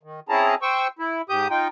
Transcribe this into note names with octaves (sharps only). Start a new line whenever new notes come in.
D#3
C4 C#4 E4 G#4 A5 A#5
C5 G5 C#6 E6
E4
G#2 G4 D#6 G6
D#4 F4 G5